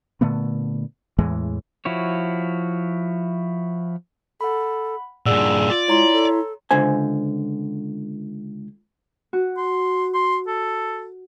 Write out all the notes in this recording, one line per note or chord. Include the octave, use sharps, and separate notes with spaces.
A#2 D3 A3 B3
E2 A2 E3 G#3
F3 E4 F#4 C#5
A4 F#5 B5
G2 A#2 G#4 D5 F#5 E6
F4 D5
G#3 E4 C#5 A#5 C6
A4
C#2 D3 C5 G#5
F#4
C6
C6
A4